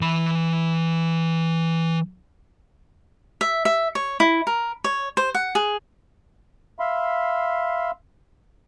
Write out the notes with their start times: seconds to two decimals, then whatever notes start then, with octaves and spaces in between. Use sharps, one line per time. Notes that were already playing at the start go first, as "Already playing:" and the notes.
0.01 E3 B5
3.41 E5
3.65 E5
3.95 C#5
4.20 E4
4.47 A#4
4.84 C#5
5.17 C5
5.35 F#5
5.55 G#4
6.80 E5 F5 B5 C6